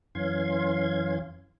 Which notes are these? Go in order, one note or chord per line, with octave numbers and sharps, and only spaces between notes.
F#2 E3 C#4 F5 C6 G#6